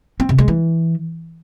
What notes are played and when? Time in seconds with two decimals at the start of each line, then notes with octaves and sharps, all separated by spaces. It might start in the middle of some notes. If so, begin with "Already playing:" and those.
0.20 C4
0.29 C3
0.38 G#3
0.48 E3